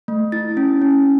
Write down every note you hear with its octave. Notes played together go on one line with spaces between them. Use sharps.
A3
E4 A6
C#4
C#4